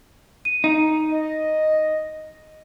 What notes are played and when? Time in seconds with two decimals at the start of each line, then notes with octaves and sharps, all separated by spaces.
0.45 D#7
0.64 D#4
1.11 D#5